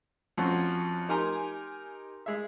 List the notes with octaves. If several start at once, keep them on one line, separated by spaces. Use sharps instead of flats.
F2 F3 F#3 C4 C#4
D#4 G4 A#4 G#5 A#5 C6
G#3 E5